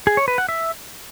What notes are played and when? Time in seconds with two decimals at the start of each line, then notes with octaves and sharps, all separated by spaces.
0.07 G#4
0.17 C#5
0.28 B4
0.38 F#5
0.49 E5